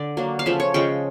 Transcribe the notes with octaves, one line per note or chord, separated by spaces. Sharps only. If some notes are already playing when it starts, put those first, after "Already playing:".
Already playing: D3 D5
F#3 A#3 D4
F5
C#3 F3 A3 E5
C#5
C#3 F3 G#3 G5